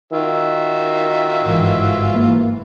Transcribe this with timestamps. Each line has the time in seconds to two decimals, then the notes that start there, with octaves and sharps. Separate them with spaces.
0.13 D#3 F4 F#4 E5
1.43 G1 G#2 E3
2.15 A#3